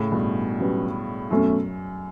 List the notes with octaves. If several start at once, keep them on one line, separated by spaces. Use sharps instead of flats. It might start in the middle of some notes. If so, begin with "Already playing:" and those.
Already playing: A2 C#3
G2 B2
F#3 C#4 G4 B4
F#2 B2 A3 C#4